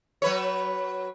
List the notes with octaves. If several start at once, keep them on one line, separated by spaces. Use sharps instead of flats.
F#3 B4 C#5